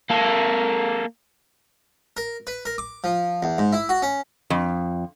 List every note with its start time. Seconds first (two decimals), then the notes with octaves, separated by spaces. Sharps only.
0.10 A#3 A4
2.17 A#4
2.47 B4
2.65 A#4
2.78 D6
3.04 F3
3.43 E2
3.58 G#2
3.73 E4
3.89 F#4
4.02 C#4
4.50 F2